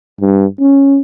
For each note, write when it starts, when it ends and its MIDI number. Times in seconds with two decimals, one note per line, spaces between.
0.21 0.46 43
0.60 1.00 61